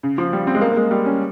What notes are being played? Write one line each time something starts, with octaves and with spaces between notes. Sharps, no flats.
C#3
F3
G3
C4
G#3
A#3
A#3
G#3
G3
C#4